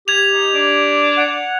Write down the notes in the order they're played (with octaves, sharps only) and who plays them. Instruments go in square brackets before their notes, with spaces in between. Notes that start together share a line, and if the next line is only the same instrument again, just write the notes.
[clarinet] G4 [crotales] G#6 F7
[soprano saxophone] D#4
D4
[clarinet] F#5